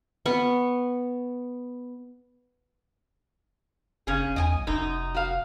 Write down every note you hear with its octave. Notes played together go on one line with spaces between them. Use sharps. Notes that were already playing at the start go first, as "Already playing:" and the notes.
B3 C#6
F#1 C#3 C#4 G#4
E2 D#5 G5 G#5
C2
F1 F#2 D#4
F#4 F5